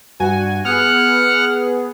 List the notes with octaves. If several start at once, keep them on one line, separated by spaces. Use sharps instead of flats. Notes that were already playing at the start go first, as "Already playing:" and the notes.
G2 F#4 G#5
B3 G#4 F#5 F6